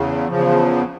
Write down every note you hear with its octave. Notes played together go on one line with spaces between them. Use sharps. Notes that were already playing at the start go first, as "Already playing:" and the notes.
Already playing: E2 C#3
E2 C#3 F3